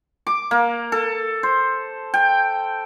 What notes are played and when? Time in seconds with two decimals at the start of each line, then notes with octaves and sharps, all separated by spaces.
0.27 D6
0.51 A#3
0.92 A4
1.43 C5
2.14 G5